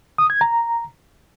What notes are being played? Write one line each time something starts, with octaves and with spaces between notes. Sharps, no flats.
D#6
G#6
A#5